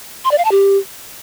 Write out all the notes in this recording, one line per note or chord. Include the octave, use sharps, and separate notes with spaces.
C6
D5
F5
A5
G4